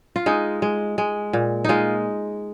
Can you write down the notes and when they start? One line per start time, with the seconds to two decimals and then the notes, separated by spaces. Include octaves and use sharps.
0.16 F4
0.26 G#3 D#4
0.62 G#3
0.98 G#3
1.33 A#2
1.64 G#3 D#4 F4